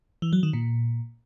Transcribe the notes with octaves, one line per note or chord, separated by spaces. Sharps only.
E3
F#3
D#3
A#2